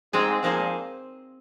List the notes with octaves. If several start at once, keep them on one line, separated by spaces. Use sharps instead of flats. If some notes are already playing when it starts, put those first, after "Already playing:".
G#2 G#3 C4 G#4
A#2 F3 A#3 D#4 G#4 C5